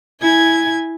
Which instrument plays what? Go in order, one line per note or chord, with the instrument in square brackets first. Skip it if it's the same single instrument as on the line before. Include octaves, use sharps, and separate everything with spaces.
[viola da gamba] E4 [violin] G#5 G#6